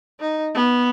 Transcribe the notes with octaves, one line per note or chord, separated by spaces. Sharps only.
D#4
B3